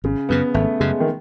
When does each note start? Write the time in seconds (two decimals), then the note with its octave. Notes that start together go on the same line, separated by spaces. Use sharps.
0.04 G#1 C#3
0.29 F#2 C#3 B3
0.54 G#1 A3
0.80 F#2 C#3 G#3
1.00 D#3